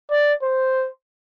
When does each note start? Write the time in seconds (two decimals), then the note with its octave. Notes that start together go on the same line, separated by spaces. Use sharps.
0.11 D5
0.43 C5